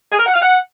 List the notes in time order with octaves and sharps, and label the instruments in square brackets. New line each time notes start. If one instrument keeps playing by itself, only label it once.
[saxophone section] G#4
A#4
F#5
F5
F#5